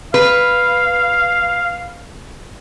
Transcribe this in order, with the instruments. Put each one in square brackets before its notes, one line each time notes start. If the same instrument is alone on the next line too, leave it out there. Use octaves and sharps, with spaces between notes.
[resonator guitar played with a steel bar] B4 [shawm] F5